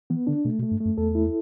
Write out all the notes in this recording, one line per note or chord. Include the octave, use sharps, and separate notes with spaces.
E3 B3
D3 D4
B2 A3
B2
A3
G2
F#2 A3
E2 A4
E4